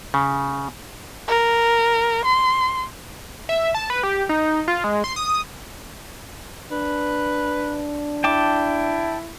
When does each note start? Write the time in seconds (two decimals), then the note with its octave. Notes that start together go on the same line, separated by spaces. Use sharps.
0.14 C#3
1.28 A#4
2.25 C6
3.49 E5
3.75 A5
3.90 B4
4.03 G4
4.29 D#4
4.68 F4
4.84 G#3
5.04 C6
5.16 D#6
6.71 D4 B4
8.24 E4 G5 A5 D6